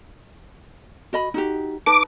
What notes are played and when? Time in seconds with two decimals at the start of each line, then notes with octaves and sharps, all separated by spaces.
1.13 F#4 D#5 B5
1.34 D#4 F#4 G4
1.86 D#4 B4 A5 D6